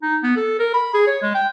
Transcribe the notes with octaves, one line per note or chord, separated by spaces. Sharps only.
D#4
B3
A4
A#4
B5
G#4
C#5
G#3
G5